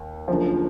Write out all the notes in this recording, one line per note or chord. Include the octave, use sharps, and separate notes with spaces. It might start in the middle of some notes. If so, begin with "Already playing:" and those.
Already playing: D#2
F#1 F#2 D3 F3